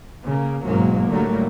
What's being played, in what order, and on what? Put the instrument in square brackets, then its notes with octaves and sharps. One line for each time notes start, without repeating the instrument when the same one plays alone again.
[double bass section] C#3 A#3
F#1 B1 G#2 F#3 A#3
A2 D3 F#3 G3 A3 A#3